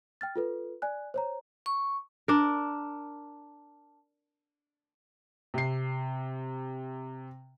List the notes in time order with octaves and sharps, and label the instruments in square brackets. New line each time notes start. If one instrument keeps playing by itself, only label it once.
[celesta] G5 F6 A6
F4 A4 B4
D5 G#5 F#6
C5 C#5 A#5
[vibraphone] C#6
[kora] D4 A#4
[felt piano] C3 C7